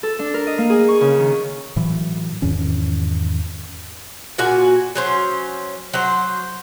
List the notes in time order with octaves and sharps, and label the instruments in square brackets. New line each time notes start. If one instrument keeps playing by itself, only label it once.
[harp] A4
D4
A#4
D#5
A#3
G#4
C#6
C#3
D#3
[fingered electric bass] A2 E3 F#3
E2 G#2 D#3 C#4
[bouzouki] A#2 F#4 G#5
F#3 C#4 C5
F#3 C5